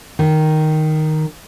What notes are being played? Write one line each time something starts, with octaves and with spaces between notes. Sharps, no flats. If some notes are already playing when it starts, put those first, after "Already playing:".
D#3